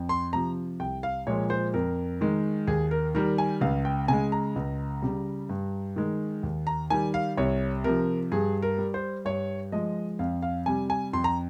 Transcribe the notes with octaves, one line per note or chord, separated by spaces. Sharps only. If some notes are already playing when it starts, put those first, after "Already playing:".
Already playing: F2
C6
C3 F3 A#5
C2 G5
F5
A#2 F3 G#3 C#5
C5
F2 A#4
D#3 G#3
D#2 G#4
A#4
D#3 G3 A#4
G#5
C#2 F5
G5
C#3 G#3 G#5
A#5
C#2
C#3 G3
G2
D#3 G#3
D#2
A#5
D#3 G3 G#5
F5
C2 C#5
C3 F3 A#4
G2 G#4
A#4
G3
C5
G2 C#5
F3 G#3 D#5
F2 F5
F5
C3 G3 G#5
G#5
F2 C6
A#5